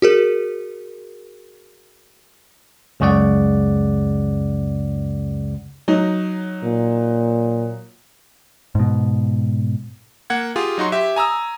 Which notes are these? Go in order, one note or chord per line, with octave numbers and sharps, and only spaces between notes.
F#4 G#4 A#4
C#2 F#2 C#3 G#3 D5 F#5
F#3 D#4
A#2
G#2 B2
A#3 F#5 G#6
F4 G4 G#4
F#3 D#4 F#4 C6
G4 E5
G#5 A#5 D#6 E6